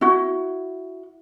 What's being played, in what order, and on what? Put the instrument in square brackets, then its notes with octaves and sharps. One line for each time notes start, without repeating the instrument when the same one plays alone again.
[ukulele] E4 F#4